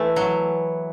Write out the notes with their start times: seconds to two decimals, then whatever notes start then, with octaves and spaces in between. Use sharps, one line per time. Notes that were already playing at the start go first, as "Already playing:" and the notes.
Already playing: E3 A3
0.16 F#3